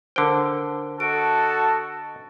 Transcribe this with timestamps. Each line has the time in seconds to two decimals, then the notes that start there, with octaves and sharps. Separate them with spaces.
0.16 D3 A#4 C5 G5
1.00 F#4 A4 D#5 A5 D7